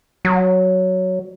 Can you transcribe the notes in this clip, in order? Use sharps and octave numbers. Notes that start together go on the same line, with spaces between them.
F#3